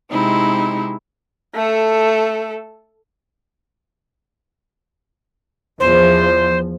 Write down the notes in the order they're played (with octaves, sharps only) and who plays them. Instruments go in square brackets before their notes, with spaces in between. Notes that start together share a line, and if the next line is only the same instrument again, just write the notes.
[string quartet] C3 G#3 C4 D#4 E4
[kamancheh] A3 A4
[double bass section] E2 F3 [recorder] C5